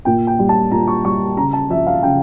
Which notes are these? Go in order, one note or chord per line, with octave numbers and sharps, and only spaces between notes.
A#2 G5
G5
G3
A5
A#2 A#5
C#6
G3 C#6
C#3 A#5
A5
F3 E5
F5
C#3 G5